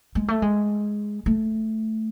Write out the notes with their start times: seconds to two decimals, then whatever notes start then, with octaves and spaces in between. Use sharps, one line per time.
0.15 G#3
0.28 A3
0.42 G#3
1.26 A3